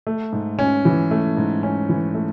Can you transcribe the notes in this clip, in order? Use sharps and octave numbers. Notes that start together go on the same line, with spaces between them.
A3
G#2
C#4
E3
A3
G#2
C#4
E3
A3